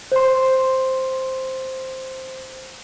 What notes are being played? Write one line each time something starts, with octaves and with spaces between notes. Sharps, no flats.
C5 C6